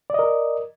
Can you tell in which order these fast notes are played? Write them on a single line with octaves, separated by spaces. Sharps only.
D5 D#5 A#4